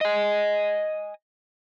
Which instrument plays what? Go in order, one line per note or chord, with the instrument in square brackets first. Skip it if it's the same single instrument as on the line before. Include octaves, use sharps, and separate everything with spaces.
[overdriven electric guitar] D#5 G#5